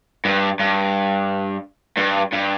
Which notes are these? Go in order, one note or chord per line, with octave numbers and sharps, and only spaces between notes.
G2
G2
G2
G2